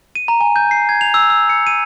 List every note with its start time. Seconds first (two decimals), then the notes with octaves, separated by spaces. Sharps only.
0.15 D#7
0.28 A#5
0.41 G#5
0.56 G6
0.71 C7
0.89 G#6
1.01 F7
1.14 E6
1.30 E6
1.49 C#7
1.67 D#7